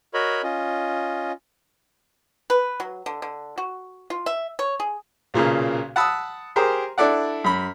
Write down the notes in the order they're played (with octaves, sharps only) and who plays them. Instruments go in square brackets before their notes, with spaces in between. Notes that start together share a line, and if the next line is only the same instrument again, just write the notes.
[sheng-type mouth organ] F#4 A#4 C#5 D#5 B5
C#4 F4 D#5
[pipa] B4
F#3
D3
D3
F#4
F4
E5
C#5
G#4
[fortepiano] B1 A#2 C#3 A#3
F#5 A5 B5 D#6 E6
G4 G#4 A#4 C5
D4 E4 A4 D5 F#5
F#2 B5